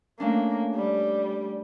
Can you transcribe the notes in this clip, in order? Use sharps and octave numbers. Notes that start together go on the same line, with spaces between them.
A3 A#3 C#4 D4
G3